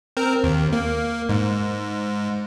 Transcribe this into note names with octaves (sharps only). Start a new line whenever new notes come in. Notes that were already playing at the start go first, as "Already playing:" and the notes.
C4 A#4
D#2
A#3
G#2